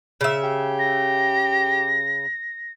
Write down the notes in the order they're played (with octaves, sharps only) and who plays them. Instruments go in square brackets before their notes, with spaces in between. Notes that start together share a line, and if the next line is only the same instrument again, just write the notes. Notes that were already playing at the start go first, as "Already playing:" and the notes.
[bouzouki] C#3 E5
[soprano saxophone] G4
[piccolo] A#6